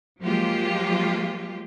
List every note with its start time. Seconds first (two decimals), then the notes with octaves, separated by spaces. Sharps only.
0.22 F3 F#3 G#3 A#3 F4 G4